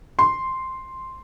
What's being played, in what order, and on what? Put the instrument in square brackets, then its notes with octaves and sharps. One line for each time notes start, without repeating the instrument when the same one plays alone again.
[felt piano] C6